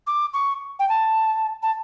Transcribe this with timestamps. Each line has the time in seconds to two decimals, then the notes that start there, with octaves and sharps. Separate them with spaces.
0.07 D6
0.34 C#6
0.79 G5
0.89 A5
1.63 A5